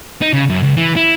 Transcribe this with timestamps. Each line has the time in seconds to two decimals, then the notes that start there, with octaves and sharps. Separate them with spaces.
0.21 D#4
0.33 C#3
0.49 F#2
0.63 C#2
0.77 E3
0.96 E4